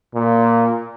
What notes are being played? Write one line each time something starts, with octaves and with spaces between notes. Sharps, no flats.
A#2